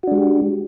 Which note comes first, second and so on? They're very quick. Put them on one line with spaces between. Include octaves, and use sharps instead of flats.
F#4 D4 G#3 G4